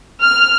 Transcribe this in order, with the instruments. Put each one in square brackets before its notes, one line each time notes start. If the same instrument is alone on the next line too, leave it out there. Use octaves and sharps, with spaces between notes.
[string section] F6